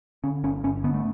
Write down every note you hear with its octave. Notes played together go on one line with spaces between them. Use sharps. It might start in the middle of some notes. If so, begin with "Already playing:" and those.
D3 C#4
G1 C#4
G1 C#4
D3 B3
A3